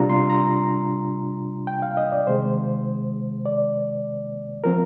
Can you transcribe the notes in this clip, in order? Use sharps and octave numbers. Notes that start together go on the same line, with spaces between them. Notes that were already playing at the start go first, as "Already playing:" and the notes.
Already playing: C3 G3 D4 F4 A#5
C6
A#5
G5
F5
D#5
D5
C3 D#3 G#3 C5
D5
F3 C4 A#4